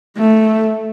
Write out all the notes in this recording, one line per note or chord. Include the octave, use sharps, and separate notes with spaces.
A3